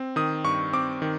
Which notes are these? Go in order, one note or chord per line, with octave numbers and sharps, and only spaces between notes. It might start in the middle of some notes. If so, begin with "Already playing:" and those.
Already playing: C4
D#3 D#6
G2 C#6
C4 D6
D#3